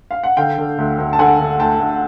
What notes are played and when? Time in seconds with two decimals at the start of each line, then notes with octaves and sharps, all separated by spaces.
0.11 F5
0.23 F#5
0.37 D3 F5 G5
0.58 D3
0.78 D2
0.98 D2
1.13 A5
1.19 D3 F#5 G#5
1.39 D3
1.60 D2 G5 A5
1.80 D2